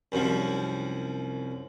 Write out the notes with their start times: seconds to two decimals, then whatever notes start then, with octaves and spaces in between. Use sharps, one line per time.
0.12 C2 F#2 F3